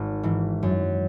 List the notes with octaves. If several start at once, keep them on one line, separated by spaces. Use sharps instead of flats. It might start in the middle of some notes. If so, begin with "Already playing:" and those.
Already playing: G#1
G#2 E3
F#2